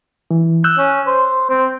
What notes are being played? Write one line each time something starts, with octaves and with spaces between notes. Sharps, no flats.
E3
E6 F#6 G6
C#4
C5
C4